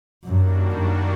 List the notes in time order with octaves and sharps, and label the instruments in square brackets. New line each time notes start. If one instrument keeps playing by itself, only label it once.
[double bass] F#2 [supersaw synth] D#3 G3 A#3 D4 F#4
[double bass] F#2